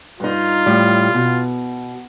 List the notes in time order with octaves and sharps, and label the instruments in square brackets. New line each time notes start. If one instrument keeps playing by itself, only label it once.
[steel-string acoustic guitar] G2 D#4 [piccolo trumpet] F4
[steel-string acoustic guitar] A2 G3
B2